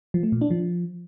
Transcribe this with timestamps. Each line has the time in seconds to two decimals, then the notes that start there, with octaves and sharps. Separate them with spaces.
0.14 F3
0.23 A3
0.32 A#2
0.41 D4
0.50 F3